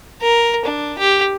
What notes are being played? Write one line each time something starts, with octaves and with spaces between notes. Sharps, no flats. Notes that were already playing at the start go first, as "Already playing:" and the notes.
A#4
D4
G4